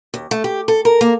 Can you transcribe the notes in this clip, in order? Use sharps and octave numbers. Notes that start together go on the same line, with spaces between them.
D#2
A3
G4
A4
A#4
A#3